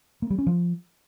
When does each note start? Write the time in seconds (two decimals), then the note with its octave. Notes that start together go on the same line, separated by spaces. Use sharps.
0.22 A#3
0.30 G3
0.39 C#4
0.47 F3